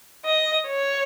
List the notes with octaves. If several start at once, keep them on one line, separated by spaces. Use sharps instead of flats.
D#5
C#5